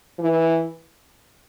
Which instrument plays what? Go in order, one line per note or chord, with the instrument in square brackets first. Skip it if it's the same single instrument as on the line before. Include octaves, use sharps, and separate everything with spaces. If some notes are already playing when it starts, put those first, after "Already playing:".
[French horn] E3